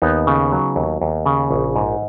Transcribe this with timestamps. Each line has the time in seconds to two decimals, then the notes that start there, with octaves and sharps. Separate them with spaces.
0.02 D#2 B3 D#4
0.27 C#3
0.52 F#3
0.76 D#2
1.01 D#2
1.26 C#3
1.51 A#1
1.76 G#2